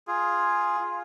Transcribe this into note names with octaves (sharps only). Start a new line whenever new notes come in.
F4 G#4
F4